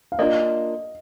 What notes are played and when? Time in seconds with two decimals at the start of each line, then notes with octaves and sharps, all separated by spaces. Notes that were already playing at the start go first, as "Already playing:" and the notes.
0.12 F5
0.19 A#3 D4 F4 D#5